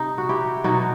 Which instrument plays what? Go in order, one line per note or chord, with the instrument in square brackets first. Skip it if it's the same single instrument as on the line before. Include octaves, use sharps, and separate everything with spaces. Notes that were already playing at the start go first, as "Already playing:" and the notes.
Already playing: [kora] C3 D#4
F#4
E4 G4
B2 F#3 D#4 F#4